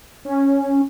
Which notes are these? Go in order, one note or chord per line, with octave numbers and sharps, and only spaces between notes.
C#4